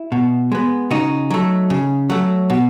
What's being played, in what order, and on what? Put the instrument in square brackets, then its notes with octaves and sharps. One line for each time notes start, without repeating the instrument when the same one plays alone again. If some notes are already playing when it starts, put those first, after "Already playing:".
Already playing: [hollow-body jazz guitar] E4
B2
G#3 B3
C#3 D#4 F#4
F#3 A3
C#3
F#3 A3
B2